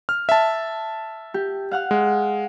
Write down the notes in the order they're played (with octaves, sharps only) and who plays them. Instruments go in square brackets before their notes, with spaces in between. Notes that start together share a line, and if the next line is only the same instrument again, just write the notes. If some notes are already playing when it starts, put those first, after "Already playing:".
[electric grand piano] F6
E5 A5
[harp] G4
F5 F#5 F6
[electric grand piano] G#3